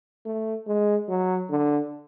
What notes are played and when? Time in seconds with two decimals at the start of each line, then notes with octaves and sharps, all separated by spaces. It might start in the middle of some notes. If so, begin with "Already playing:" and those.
0.25 A3
0.67 G#3
1.09 F#3
1.50 D3